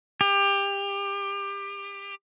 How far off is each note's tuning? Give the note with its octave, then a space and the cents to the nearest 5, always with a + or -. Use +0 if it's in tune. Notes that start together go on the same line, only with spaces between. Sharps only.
G4 +25